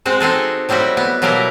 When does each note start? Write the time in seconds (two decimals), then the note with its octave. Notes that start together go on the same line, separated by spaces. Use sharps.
0.06 G#3 C4 F#4
0.20 C4 D#4 G#4 A4
0.69 F#3 G3 C4 E4 F#4
0.97 B3
1.22 B2 F#3 G3 A#3 E4 A#4